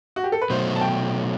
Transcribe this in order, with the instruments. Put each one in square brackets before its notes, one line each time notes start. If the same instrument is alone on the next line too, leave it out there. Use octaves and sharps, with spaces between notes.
[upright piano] F#4
G4
A4
B4
[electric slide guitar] B2 F#3 A3 [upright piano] C5
[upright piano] A5
G5